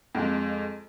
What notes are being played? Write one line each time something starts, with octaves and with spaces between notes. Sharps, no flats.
F2 G#3